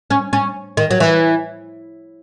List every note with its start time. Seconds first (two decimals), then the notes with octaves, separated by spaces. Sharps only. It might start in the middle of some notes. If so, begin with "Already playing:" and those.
0.10 C#4
0.33 C#4
0.77 D#3
0.91 F#3
1.00 E3